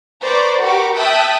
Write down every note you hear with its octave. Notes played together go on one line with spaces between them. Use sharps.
B4 C5 D5 A#5 C#6
F#4 G4 A#4 B5 C#6 D6
E5 G5 A5 D#6 E6 F#6